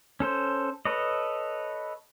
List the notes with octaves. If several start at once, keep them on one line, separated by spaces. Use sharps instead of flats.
C#4 A4 C5
A4 B4 C#5 D#5